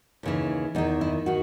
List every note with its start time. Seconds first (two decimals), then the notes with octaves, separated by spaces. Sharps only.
0.23 D#2 C#3 E3
0.75 E2 D#3 D#4
1.01 E4
1.26 D#3 F#4